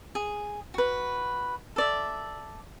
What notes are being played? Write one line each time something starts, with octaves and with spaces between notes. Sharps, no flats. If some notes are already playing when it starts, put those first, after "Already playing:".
G#4
F#4 B4
A4 D5 E5